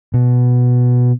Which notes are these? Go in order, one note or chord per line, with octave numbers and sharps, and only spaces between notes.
B2